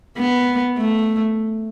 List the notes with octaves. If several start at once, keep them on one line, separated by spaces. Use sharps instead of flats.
B3
A3